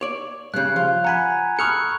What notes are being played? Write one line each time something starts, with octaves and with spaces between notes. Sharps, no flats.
C#5 D5
G2 C#3 F#6 G6
F3 F4
F#5 G#5 A#5 B5 G#6
A4 B5 C#6 D#6 F6 F#6 C#7